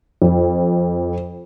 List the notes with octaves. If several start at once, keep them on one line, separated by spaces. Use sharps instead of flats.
F2